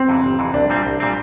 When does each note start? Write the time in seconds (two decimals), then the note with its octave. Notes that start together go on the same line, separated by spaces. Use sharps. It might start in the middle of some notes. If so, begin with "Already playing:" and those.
Already playing: C4
0.09 F2 C3 E3
0.24 G1
0.39 F2 C3 E3
0.54 C2 D4
0.70 A#2 G3 C4
0.85 C2
1.00 A#2 G3 C4